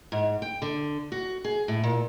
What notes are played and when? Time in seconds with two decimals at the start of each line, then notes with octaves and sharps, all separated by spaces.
0.12 G#2
0.42 G5
0.62 D3
1.12 F#4
1.44 G#4
1.68 A2
1.83 A#2